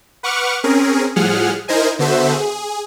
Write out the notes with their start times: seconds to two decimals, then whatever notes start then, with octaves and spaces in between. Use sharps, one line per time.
0.23 B4 F#5 C#6 D6 F6
0.64 C4 C#4 G#4 A#4
1.16 A2 F3 G3 G#4 F#5 F6
1.68 D#4 E4 A#4 C5 D#5 G#5
1.99 D3 B3 F#4 A4 C5 E5
2.33 G#4